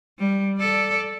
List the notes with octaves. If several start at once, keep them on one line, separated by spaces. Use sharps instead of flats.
G3
A4 D5